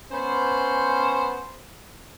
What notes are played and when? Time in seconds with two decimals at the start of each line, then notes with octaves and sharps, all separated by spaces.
0.11 B3 C#4 C5